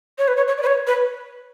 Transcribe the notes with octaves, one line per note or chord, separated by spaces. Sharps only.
C#5
B4
C#5
C#5
D5
B4
C#5
B4